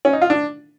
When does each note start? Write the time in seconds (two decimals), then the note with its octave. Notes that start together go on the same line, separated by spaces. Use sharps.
0.05 C#4
0.13 D#4
0.22 F4
0.30 D4